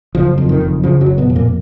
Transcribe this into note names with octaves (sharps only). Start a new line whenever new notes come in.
F#1 F3
F2
D#3
F#1
C#3 F3
F#2 F#3
F#1
B2 B3
F2
A#2 A#3